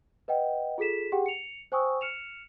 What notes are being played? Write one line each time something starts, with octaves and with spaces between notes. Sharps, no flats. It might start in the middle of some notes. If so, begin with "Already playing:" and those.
B4 D#5 F#5 G5
F4 G#4 A4 B6 E7
G4 G#4 F#5 G5
C#7 F7
C5 G5 G#5 C#6 D#6 E6
F6 C#7 E7 F7